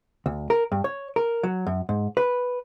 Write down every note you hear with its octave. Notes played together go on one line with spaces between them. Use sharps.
D2
A#4
G2
C#5
A#4
F#3
F#2
G#2
B4